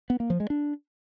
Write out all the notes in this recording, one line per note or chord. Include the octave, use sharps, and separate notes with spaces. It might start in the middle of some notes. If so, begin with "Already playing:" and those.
B3
A#3
F3
G#3
D4